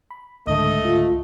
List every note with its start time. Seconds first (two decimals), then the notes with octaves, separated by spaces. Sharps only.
0.11 B5
0.47 C#2 G#2 D3 A3 D#5 D#6
0.85 F4